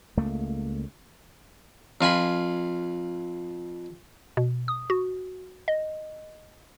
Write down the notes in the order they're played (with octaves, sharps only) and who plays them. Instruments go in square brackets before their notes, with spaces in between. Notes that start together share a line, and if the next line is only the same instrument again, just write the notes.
[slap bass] C#2 A3 A#3
[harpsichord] F2 F4 G#5 B5
[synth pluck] B2
D#6
F#4
D#5